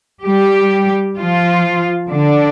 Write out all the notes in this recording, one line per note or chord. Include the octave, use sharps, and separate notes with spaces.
G3 G4
F3 F4
D3 D4